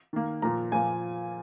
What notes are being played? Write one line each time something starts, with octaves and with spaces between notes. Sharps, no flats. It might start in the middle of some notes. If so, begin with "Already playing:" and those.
D#3 A#3
A#2 F3 A#3 A#5
A#2 F3 A#3 G#5